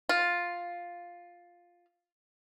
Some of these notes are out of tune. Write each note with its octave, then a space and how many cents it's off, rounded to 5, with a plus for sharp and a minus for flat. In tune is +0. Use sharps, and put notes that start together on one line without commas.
F4 +5